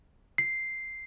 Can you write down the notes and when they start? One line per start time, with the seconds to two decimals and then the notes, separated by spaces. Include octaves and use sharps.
0.38 C7